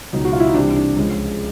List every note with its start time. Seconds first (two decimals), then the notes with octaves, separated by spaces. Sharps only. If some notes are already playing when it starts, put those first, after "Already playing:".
0.13 C#2 B2 F#3 D#4
0.25 F#4
0.33 F4
0.40 E4
0.47 D#4
0.54 C2 C3 E3 D4
0.76 D4
0.97 C#2 C#3 F3 G#3